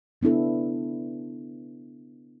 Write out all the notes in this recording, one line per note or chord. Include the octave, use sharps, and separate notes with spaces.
C#3 B3 D4 E4 A4